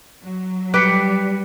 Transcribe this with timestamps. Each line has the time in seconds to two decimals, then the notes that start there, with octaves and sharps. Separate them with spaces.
0.22 F#3
0.74 G3 G4 B4 F#6 B6 C#7